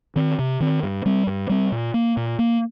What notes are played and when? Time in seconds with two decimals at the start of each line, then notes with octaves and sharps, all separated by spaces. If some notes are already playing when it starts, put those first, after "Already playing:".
0.16 D#3 C4
0.39 C3
0.60 D#3 C4
0.83 G2
1.06 G3 C4
1.27 G2
1.49 G3 C4
1.72 A#2
1.94 A#3
2.17 A#2
2.39 A#3